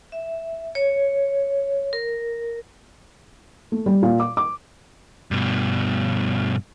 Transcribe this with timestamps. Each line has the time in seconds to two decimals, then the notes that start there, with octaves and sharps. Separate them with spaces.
0.12 E5
0.75 C#5
1.93 A#4
3.72 A3
3.86 G3
4.03 A#2
4.20 D6
4.37 D6
5.31 G2 B2